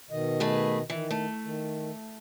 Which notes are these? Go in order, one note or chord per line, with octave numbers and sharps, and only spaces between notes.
B2 D#3 D#5
A3 G#4 B4
D#3 E3
A3
D#3